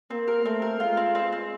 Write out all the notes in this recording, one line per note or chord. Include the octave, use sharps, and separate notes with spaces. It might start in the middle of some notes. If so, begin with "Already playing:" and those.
A#3 C4
A#4
A3 C4
A#4
G#3 F4
C4
C4
C4